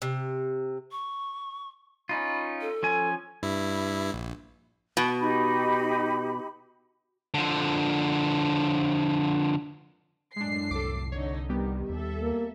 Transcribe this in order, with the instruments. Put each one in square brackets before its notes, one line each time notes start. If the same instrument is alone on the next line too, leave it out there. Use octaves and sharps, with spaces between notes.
[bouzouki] C3
[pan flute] C#6
[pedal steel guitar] C#4 D#4 F4 [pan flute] B5
[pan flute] A4
[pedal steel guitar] F3 C#4 G#5
[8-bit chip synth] G2 E4
A#1
[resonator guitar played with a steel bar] B2
[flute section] D#4 G4 B5
[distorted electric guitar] D3 F3
[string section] F#2 A2 C7 [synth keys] G#3 D4
[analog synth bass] C2 [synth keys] A4 D6
[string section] D3 D#4 [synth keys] C#5
[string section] D#3 [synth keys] G3 B3 G4
[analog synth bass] D#2 [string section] A4 E5
[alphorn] A#3